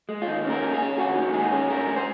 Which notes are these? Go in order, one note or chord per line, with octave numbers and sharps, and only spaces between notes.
G#3
F4
D#2 D#4
C#4 A#4
C#4
G#4
C#4
D#2 F#4
D#3
G#3 G#4
C#4
G#2 A#4
G#3
C5